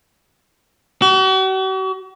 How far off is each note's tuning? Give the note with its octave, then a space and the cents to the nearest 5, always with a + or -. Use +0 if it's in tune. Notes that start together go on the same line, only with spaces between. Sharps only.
F#4 +45